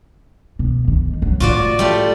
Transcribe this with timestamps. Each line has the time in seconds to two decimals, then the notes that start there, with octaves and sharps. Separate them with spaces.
0.59 B2
0.88 D#3
1.22 F#3
1.40 A2 F4 F#4 D5
1.79 G3 A3 F4